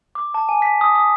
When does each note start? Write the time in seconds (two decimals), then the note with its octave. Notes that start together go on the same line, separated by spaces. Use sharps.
0.15 D6
0.34 A5
0.49 G#5
0.62 B6
0.81 D#6
0.95 D#6